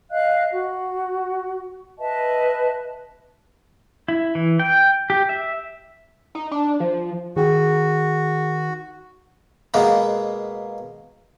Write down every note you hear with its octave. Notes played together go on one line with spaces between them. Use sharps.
D#5 F5 F#6
F#4
B4 D#5 E5 A5
E4
E3
G5
G4
E5
D#4
D4
F3
D#3 F#4 G#4
B2 G#3 A#3 B3